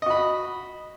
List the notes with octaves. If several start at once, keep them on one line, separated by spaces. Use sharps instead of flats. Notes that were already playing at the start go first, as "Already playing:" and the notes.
F#4 D#5 B5